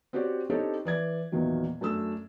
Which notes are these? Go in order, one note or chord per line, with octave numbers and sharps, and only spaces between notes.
C4 F#4 G4 C#5 D5
C4 D4 D#4 G4 A4 C#5
E3 D5 G#6
E2 A#2 D#3 E3 F#3
F#2 A3 D4 E6